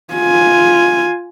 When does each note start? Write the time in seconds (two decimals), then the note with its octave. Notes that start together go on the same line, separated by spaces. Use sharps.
0.14 F4 G#5